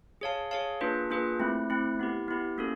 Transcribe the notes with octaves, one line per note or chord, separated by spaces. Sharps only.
G#4 C#5 F5 A5
G#4 C#5 F5 A5
A#3 D4 F4 G#4 B4
A#3 D4 F4 G#4 B4
A3 C4 E4
A3 C4 E4
B3 E4 G4
B3 E4 G4
A#3 C#4 F#4 A4